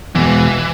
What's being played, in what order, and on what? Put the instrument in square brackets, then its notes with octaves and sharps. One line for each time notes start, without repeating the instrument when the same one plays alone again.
[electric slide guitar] E2 B2 G#3 [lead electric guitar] E3